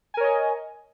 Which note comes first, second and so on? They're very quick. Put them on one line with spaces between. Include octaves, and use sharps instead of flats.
G#5 A#4 C#5 D#5